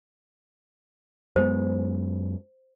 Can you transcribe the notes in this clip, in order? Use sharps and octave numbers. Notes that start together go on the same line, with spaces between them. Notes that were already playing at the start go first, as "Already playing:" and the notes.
F#2 G#3 B3 C5